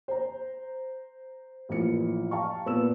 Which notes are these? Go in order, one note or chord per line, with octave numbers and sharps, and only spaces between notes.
C5 A#5
A1 F3 A#3 E4 C#7
F5 A5 A#5 C#6
A#2 B3 E6 E7